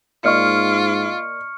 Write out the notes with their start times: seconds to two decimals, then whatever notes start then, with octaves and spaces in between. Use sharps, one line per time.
0.24 G#2 A#3 F4 D5 D#5 C#6 F6 C#7